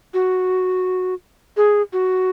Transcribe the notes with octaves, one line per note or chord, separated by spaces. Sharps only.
F#4
G#4
F#4